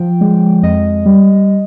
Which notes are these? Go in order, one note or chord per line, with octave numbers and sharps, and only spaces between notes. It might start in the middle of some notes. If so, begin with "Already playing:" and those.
Already playing: F3 G5
G#3
F2 D#5
G3